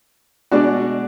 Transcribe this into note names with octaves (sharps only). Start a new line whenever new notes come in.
B2 G#3 D4 F#4